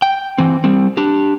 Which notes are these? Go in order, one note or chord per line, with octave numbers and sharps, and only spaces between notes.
G5
E3 C4
G3 C4
D4 G4